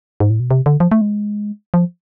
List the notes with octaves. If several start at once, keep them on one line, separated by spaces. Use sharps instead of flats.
G#2
A2
B2
C3
D3
F3
A3
G#3
F3